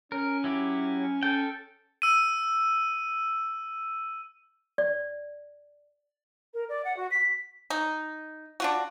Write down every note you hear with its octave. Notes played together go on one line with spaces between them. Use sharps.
C#4 A#4
F#3 E4 G4
C#4 A4 G5
E6 D#7
D5
A#4
D5
F#5
F#4
B6
D#4
D4 F4 F#4